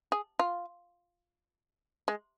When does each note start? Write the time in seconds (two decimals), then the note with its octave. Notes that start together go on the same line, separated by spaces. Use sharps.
0.12 G#4
0.39 F4
2.08 G#3